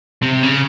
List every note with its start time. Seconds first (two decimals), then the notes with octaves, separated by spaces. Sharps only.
0.23 C3
0.43 C#3